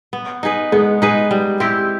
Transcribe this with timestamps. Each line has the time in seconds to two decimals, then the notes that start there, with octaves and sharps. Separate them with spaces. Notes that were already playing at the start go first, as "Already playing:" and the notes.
0.13 B3
0.43 D#4 G#4 B4
0.72 G#3 B3
1.02 D#4 G#4 B4
1.31 G3
1.60 C4 E4 G4